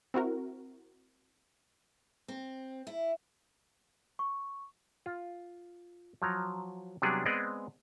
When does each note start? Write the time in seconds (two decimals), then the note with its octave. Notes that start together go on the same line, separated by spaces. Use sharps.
0.14 C4 E4 F#4 A#4
2.28 C4
2.87 E4
4.19 C#6
5.06 F4
6.22 F3 F#3 A#5
7.02 C3 F#3 G3 B3 D4 G#4
7.25 G#3 B3 C4 G#4 D5 D#5